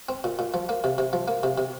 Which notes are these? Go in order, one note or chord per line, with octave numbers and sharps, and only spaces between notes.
C4
A#2
A#2
F3
A#3
C3
C3
F3
A#3
C3
C3